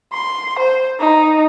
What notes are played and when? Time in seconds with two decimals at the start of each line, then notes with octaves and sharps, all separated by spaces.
0.12 C6
0.59 C5
0.99 D#4